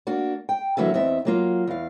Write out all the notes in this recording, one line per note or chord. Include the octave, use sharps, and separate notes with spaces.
A#3 D4 F#4
G5
D3 E3 F#3 A#3 F#4 E5
E2 C4 D#4 E5
F#3 A#3 F4
E2 F5